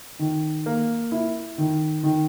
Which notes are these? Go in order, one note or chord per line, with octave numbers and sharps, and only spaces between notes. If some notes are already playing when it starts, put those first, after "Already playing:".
D#3
A#3
E4
D#3
D#3